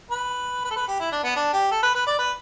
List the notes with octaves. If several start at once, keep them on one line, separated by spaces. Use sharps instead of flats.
B4
B4
A4
B4
G4
E4
D4
B3
D4
G4
A4
B4
B4
D5
B4